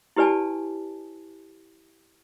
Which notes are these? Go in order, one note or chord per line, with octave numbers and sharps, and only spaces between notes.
E4 G4 B4 D5 G#5 A5